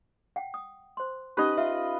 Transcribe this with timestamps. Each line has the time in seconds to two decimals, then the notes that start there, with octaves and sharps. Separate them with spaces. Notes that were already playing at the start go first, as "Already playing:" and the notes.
0.36 F#5 G5
0.54 D#6
0.97 C5 C6
1.37 C#4 D#4 G4 B4 D#5
1.58 F4 E5